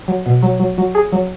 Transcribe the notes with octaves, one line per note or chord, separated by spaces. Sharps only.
F#3
B2
F#3
F#3
F#3
G#4
F#3